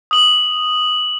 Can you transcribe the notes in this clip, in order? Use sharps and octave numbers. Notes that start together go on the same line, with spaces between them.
D#6 F#7